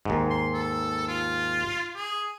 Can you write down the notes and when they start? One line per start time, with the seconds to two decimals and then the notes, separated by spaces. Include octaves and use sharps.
0.05 D#2 G#2
0.30 C6
0.54 A4
1.08 F4
1.95 G#4